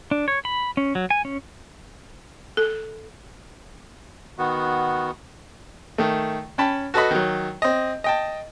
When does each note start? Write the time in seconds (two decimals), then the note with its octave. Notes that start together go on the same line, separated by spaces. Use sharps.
0.11 D4
0.28 C#5
0.45 B5
0.77 C#4
0.95 F#3
1.10 G#5
1.25 C#4
2.57 A4
4.38 D#3 B3 F#4
5.98 D#3 A3
6.58 C#4 G5 A5 B5
6.94 F#4 A4 B4 D#5 B5
7.11 D#3 F#3
7.62 C4 D#5
8.04 D#5 G5 A5